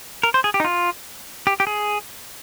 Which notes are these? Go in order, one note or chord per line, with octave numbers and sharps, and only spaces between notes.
A#4
C5
G#4
G4
D#4
F4
G4
G4
G#4